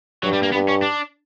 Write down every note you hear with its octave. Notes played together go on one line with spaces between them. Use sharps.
G2 F#3
G3
A#3
G2 B3
C#4
D4